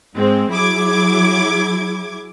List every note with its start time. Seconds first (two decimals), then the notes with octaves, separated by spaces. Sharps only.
0.16 G#2 G#3 C4
0.51 F#3 E4 G#4 D6 G#6